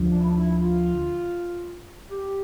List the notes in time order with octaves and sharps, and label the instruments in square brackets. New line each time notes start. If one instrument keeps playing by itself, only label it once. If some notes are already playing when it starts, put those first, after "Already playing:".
Already playing: [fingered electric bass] D2 D3 F3
[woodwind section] D4
E4
D4
E4
F4
G4